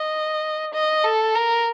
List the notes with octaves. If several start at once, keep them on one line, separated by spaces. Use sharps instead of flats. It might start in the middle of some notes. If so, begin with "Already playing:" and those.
Already playing: D#5
D#5
A4
A#4